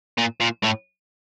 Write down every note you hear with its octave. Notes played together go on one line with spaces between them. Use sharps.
A#2
A#2
A2